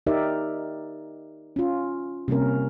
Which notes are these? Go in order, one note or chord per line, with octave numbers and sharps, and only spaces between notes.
D#4 G4 A#4 D5 E5
C#4 F4
C3 G3 A#3 C#4 A#4